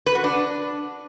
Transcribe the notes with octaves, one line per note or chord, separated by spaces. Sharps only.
B4
F#4
D4